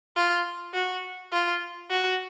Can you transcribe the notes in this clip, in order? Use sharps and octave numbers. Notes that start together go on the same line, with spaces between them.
F4
F#4
F4
F#4